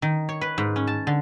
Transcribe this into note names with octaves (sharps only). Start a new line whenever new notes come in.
D#3
C#5
B4
G#2
C#4
A5
D3